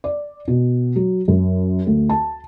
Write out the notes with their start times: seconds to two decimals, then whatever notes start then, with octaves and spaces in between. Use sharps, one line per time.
0.04 D5
0.48 B2
0.96 F#3
1.28 F#2
1.87 D2
2.09 A5